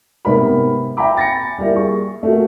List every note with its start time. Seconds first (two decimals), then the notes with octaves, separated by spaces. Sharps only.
0.25 G#2 C3 B3 A#4 B5
0.97 E5 G5 G#5 A#5 B5 D6
1.17 A6 A#6 C#7
1.58 G3 A#3 E4
1.76 G#4 C#6
2.23 A3 A#3 F#4